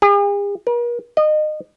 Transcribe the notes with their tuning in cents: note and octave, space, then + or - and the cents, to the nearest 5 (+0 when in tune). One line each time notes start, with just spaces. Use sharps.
G#4 -45
A#4 +45
D#5 -25